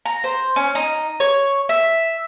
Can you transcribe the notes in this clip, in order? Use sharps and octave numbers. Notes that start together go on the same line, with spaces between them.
A#5
C5
C#4
D#4
C#5
E5